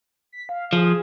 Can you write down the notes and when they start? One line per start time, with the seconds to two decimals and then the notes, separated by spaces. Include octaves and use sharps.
0.32 B6
0.49 F5
0.73 F3 G#4